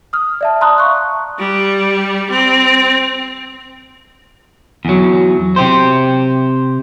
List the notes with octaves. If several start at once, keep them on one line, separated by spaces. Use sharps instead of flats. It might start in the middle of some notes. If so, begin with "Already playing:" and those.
D#6 F6
D5 E5 A5
A5 A#5 C6 D#6 F#6
F5 C#6 F#6
G3
C4
E2 F#3
C3 G4 C5